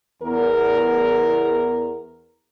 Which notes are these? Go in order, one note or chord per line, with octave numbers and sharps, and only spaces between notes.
E2 A#4